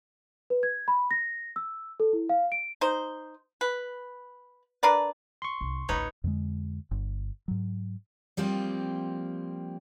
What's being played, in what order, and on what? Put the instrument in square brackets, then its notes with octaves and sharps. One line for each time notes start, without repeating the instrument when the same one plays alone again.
[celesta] B4
G#6
B5
A#6
E6
A4
E4
F5
D7
[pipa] D#4 C5
B4
D4 A#4 B4 D5
[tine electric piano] C6 C#6
[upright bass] C2
[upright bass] A1 D2 [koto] D#4 B4 C#5
[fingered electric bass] F2 D3 G#3
G1
G#2 F#3
[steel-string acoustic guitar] F3 G3 A#3 C4 F4